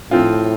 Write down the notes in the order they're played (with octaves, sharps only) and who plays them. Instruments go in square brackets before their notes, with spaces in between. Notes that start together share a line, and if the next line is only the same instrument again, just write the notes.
[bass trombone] A2 [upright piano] F3 C4 F4